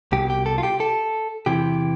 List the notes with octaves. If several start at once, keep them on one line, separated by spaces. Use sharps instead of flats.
C2 B2 G4
G4
A4
F4
G4
A4
E2 C3 E3 G4